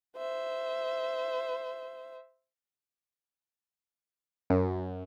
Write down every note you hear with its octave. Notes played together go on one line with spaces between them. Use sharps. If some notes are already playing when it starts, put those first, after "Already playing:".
C5 E5
F#2